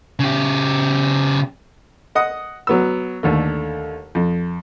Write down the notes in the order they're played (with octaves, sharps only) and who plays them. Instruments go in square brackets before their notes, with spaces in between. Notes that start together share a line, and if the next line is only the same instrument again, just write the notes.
[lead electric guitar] C#3 G4
[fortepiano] D#5 F#5 D#6
F#3 B3 E6
D#2 D3 A3
F2